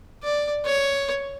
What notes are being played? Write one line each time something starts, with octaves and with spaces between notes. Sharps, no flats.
D5
C#5